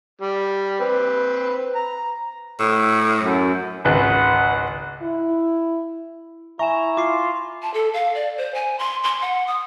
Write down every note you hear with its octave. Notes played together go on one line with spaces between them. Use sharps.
G3
C4 B4
A#5
A2
F#2
G#1 C#2 B4 F#5
E4
E4 E5 G#5 A#5 C#6 E7
F4 D6 C7
A5
A4
F5
D5
C5
G#5
C6
C6
F#5
D#6